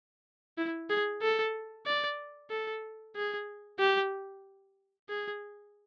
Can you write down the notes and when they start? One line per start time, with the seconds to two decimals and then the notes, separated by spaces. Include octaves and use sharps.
0.58 E4
0.90 G#4
1.23 A4
1.86 D5
2.51 A4
3.16 G#4
3.80 G4
5.10 G#4